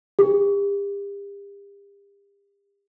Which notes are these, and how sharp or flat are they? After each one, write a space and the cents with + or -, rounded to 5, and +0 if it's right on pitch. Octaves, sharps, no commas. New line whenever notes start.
G4 +40